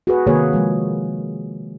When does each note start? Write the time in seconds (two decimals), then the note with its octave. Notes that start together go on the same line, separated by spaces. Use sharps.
0.07 F#4 G#4 B4
0.27 C3 D#3 A#3 G#4 B4 C#5
0.53 F3 G#3